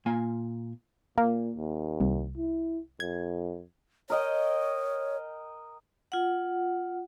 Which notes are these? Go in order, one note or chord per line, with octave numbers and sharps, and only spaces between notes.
A#2 A#3 F4 G#5
A#2 A#3
D#2
C2
E4
F2 G#6
A#4 C#5 D#5 G5
F4 F#5